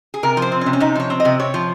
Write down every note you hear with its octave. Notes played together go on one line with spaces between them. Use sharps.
G#4
C3 A#4
F3
C5
C4
C#4
C3
C#4
C3 D#4
F3 C#5
C4
D#5
C3
C3 C#5
F3